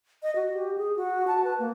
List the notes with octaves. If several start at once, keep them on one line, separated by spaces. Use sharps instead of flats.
D#5
F#4
G4
G#4
F#4
A5
B4
A#3